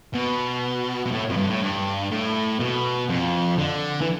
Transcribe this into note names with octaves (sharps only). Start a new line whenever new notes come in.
B2
B2
A2
F2
G2
A2
G2
A2
B2
F2
D3
E3